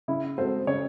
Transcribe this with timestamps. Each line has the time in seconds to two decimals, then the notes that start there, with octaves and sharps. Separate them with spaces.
0.08 C#3 E4
0.38 G#3 C4 F#4 A4 C5
0.67 C#3 C#5